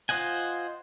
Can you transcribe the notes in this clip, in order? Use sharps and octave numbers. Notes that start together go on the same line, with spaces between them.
F4 C5 D#5 F#5 G#5